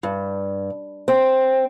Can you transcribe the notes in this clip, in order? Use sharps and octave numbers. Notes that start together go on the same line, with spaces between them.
G2
C4